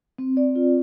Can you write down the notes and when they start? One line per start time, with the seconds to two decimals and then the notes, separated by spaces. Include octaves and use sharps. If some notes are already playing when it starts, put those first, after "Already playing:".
0.18 C4
0.37 D5
0.55 F4